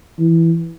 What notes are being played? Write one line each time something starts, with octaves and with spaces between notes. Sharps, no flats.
E3